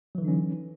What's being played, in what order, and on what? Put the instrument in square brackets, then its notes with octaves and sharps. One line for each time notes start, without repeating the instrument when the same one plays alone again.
[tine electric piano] F#3
E3
D3
D#4
C#4